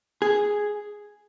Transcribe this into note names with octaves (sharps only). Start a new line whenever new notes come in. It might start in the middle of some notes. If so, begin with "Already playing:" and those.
G#4